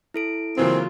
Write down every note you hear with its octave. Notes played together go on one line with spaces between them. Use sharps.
E4 A4 D7
C#3 E3 F#3 A#3 C4 F4